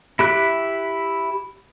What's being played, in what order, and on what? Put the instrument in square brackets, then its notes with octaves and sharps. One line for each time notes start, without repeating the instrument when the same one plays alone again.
[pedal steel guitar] E4 G4 F#6